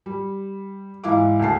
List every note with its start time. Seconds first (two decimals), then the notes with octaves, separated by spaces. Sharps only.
0.06 G3
1.04 G#2 E3 E4 F5 D6
1.40 D2 C#3 A5 C7